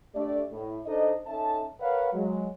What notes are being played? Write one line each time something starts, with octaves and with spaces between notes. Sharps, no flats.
A3 D4 G4 D5
A2
D4 D#4 A4 C5 D#5
C#4 D#4 A4 E5 A5
A#4 B4 C#5 F5 F#5
F#3 G#3